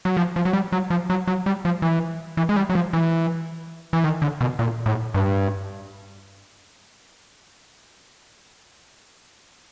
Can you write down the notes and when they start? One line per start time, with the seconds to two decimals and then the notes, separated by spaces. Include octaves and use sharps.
0.05 F#3
0.17 F3
0.36 F3
0.45 F#3
0.53 G3
0.72 F#3
0.90 F3
1.10 F#3
1.27 F#3
1.46 G3
1.65 F3
1.82 E3
2.37 E3
2.49 G#3
2.56 G3
2.70 F#3
2.75 F3
2.93 E3
3.93 E3
4.04 D#3
4.22 D3
4.41 B2
4.59 A#2
4.86 A2
5.14 G2